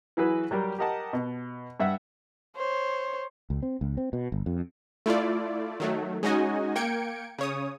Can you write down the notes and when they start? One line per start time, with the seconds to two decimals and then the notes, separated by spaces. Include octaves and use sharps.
0.17 E3 F#3 E4 F#4 G#4 B4
0.51 F#3 G3 G4 A#4
0.78 G4 A#4 D#5 F#5 A5
1.13 B2
1.80 G2 E5 F#5
2.56 C5 C#5
3.50 C#2
3.62 C4
3.81 C#2
3.97 C4
4.13 B2
4.32 G1
4.46 F2
5.06 A3 E4 F4 D5
5.80 D#3 F#3 A3
6.23 G#3 C#4 D#4 F#4 D#5 G#5
6.76 A#3 G5 G#6 C#7 D7
7.38 C#3 C#5 D#6